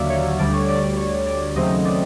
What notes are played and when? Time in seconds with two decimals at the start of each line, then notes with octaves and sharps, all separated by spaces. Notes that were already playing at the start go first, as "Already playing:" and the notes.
Already playing: D#2 D3 F#3 D5 E5 F5
0.10 C#5
0.39 D2 D3 G3 D5
0.53 C#5
0.69 D5
0.82 D5
0.97 C#5
1.26 D5
1.55 D#2 C#3 F#3 A3 C4 D#5
1.85 D5